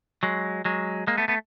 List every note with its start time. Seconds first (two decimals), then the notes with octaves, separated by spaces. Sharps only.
0.23 F#3 G#3
0.65 F#3 G#3
1.07 G#3 A#3
1.18 A3 B3
1.28 A3 B3